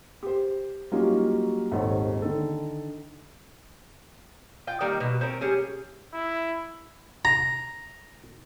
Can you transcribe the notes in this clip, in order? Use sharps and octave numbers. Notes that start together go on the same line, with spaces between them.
G4 C5
F#3 G3 A#3 C#4 D#4 F4
D#1 G#1 D#4 A4 C#5
D3 D#3 A4
F4 G5
D#3 G3 A#3 D#4
B2
C4 C#4 A#4
G3 C#4 G#4
E4
A#5